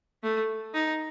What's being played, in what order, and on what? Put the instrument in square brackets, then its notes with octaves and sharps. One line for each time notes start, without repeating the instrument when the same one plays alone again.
[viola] A3
D#4